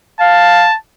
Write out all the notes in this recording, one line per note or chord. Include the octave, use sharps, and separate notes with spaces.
F5 A5